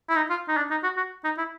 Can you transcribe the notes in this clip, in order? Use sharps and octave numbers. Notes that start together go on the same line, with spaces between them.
E4
D#4
F4
D#4
D4
D#4
F#4
F#4
D#4
E4